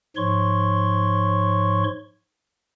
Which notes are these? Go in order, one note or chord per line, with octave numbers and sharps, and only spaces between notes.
G#2 F3 C#5 C6 C#6